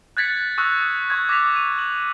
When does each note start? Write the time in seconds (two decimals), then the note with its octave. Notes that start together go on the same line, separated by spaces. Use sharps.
0.17 F#6 G#6 A6 B6 C#7
0.58 C#6 D#6 E6 F#6 A6 A#6
1.10 C#6 G#6
1.29 D6 A#6 B6 F7
1.56 D#7
1.79 F#7